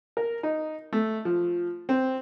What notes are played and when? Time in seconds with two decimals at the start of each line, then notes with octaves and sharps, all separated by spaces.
0.17 A#4
0.43 D#4
0.93 A3
1.25 F3
1.89 C4